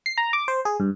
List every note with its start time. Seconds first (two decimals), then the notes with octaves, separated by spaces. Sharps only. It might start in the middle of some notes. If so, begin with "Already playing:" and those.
0.06 C7
0.17 A#5
0.33 D6
0.48 C5
0.65 G#4
0.80 G2